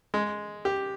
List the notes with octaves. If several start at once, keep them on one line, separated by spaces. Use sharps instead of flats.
G#3
G4